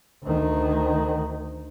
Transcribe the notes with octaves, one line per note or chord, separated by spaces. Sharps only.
D2 D#3